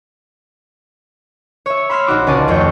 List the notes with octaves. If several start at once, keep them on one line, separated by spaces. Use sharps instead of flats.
C#5 E5
B5 C6 E6 F6 B6 C7
A#1 D#4 F#4 D6
C#2 C#4 D5 A5 D#6
D#1 F2 A3 C#5 G6 C7